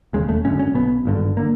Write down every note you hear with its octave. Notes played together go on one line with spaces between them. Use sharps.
E1 D#2 C#3 G#3
A3
G#1 F#2 D3 C#4
C#4
B1 B2 B3
G#1 G2 D3
D3 A#3